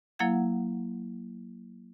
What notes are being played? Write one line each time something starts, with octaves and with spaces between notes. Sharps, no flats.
F#3 A#3 E4 F5 F#5 G#6